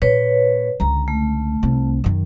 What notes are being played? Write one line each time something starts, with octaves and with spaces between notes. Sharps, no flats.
A#2 B4 C#5
C#2 D3 A#5
A3
C2 C4
F#2 D#3